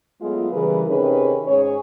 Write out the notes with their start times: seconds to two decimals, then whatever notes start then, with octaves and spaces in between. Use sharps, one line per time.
0.21 F#3 G#3 A3 B3 F4
0.52 C#3 E3 G3 G#4 A#4 B4
0.88 C3 D#3 C#4 D#4 G#4 B4
1.47 G#2 C#4 G#4 C#5